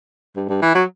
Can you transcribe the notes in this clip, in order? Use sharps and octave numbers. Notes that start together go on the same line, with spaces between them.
G2
G2
E3
F#3